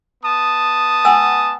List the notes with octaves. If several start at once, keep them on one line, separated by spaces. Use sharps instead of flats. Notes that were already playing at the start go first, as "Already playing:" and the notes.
B3 A5 D#6
F#5 G#5 E6